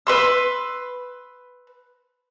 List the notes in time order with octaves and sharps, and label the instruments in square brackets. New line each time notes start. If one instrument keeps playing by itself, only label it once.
[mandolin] B4 C6 E6